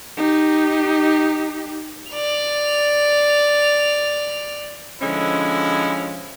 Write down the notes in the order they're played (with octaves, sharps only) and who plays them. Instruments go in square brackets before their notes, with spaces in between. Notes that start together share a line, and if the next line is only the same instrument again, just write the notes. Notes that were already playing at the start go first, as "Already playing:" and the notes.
[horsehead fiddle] D#4 G4
[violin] D5 F7
[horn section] D3 F3 G#3 C#4 E4